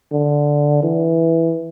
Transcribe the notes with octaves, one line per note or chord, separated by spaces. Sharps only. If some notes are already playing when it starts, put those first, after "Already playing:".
D3
E3